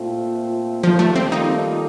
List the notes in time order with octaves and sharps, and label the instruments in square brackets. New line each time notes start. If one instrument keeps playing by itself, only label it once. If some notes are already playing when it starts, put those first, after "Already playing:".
Already playing: [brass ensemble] A#2 A3 C4 F4
[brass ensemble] D#3 G3 A#3 F4 A4 [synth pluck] F3
[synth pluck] A3
C4
D#4